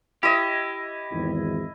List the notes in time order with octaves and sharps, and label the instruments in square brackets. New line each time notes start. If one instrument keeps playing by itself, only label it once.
[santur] E4 D#5 [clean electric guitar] G4
[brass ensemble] G#1 E2